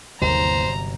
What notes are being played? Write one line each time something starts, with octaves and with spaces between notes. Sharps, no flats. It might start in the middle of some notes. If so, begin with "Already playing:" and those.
G1 D#2 C3 F#3 C5 A#5